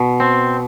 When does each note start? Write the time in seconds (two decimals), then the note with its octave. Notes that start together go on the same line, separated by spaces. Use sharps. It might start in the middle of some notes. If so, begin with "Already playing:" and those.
Already playing: B2
0.20 C4